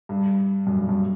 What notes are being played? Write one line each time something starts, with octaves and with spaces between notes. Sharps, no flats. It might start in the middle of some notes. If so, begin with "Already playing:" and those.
G2
F#2
G2
F#2